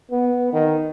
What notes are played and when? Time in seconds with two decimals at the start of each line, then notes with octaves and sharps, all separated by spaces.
0.11 B3
0.53 D#3